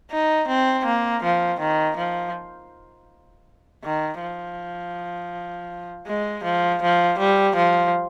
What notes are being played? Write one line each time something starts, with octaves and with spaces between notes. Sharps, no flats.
D#4
C4
A#3
F3
D#3
F3
D#3
F3
G#3
F3
F3
G3
F3